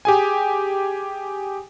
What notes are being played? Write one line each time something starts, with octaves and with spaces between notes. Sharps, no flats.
G4 G#4 G#5